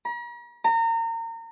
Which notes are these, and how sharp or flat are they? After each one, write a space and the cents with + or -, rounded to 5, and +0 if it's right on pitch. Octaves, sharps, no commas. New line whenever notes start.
A#5 +45
A#5 -30